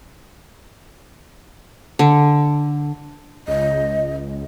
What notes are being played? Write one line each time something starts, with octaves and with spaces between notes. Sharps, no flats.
D3
C#2 D#5